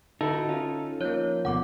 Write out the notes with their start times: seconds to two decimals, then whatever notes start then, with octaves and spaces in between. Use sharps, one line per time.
0.21 D3 D#4 E4 F#4 A4
0.49 C#4 D#4 F4
1.01 F3 A#3 C#5 G6
1.45 D2 B2 F#5 D6